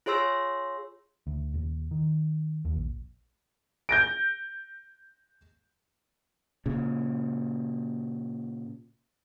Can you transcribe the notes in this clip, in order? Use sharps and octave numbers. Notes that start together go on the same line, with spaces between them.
F4 G#4 C#5 C6 E6 A#6
D2
D#1
D#3
D#2
A#1
G6 A#6 D7
A#2 C#3